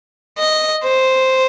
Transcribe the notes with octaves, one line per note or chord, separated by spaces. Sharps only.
D#5
C5